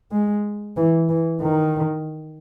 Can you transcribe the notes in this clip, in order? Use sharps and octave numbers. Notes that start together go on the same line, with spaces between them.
G#3
E3
E3
D#3